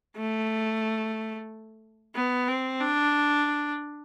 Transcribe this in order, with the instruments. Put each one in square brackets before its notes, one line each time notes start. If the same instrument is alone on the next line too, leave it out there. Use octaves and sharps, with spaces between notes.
[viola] A3
B3
C4
D4